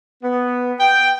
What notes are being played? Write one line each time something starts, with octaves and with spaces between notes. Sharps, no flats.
B3
G5